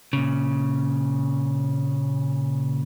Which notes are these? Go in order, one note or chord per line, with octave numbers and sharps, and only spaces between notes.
A#2 C#3